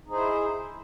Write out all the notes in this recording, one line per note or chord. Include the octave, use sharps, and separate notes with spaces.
D#4 E4 G#4 C5